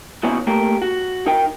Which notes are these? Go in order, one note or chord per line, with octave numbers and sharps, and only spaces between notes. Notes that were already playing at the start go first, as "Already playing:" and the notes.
A#2 E3 B3 C#4 D#4 F#4
A3 A#3 G4 A#4
F#4
D#4 A#4 G5